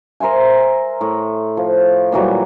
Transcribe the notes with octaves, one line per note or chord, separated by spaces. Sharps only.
A#4 C5 E5 G#5
A2
F3
A#2 E3 F#3 G3